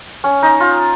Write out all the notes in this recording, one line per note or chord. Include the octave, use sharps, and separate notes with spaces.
C#4
D#4
F4